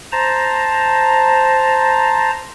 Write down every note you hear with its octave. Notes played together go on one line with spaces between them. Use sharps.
C5 A5 A#5